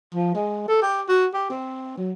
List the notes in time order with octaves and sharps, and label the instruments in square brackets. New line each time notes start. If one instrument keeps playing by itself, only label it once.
[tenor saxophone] F3
G#3
A4
G4
F#4
G4
C4
F#3